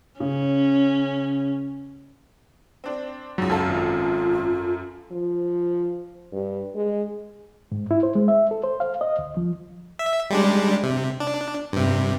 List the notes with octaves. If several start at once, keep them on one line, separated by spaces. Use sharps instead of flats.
C#3 C#4
C4 D4
C#2 G#2 F#3
F#2 A4 F5
G#1 F4
F3
G2
G#3
G#2
E4
C5
G#3
E5
A4
C5
F5
D#5
D2
F3
E5
G3 G#3 D4
C3
D4
G2 C3